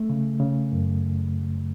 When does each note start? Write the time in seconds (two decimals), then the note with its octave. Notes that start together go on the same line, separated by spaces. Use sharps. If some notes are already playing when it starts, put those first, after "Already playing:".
Already playing: A3
0.10 C#3
0.40 C#3
0.72 F#2